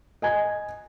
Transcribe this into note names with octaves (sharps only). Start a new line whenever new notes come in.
D#5 G#5 G#6